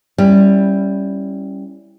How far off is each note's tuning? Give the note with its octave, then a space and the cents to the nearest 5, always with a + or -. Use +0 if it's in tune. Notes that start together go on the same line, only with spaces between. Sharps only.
G3 +0 C#4 -15 E4 +0